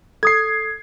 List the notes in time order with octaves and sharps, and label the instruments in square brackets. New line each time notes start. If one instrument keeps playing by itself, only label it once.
[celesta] A4 D#6 [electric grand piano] G#6 C7